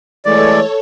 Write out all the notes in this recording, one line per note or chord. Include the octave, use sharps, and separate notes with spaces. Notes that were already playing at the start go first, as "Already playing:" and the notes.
E3 G#3 A3 A4 C#5 D5